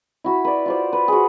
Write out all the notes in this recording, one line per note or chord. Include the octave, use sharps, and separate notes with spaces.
E4 F#4 B5
B4 D5
F4 C5 D5
B4
F#4 G#4